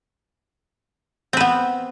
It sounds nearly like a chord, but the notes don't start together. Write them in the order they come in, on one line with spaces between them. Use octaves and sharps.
C4 B4 B3